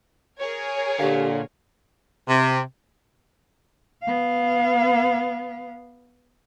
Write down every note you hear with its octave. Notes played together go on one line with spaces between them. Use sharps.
G#4 A#4 C#5
A#2 D3 G4 F5
C3
B3 F5